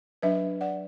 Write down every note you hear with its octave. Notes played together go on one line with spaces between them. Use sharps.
F#3 D4 B4 E5
D5 F#5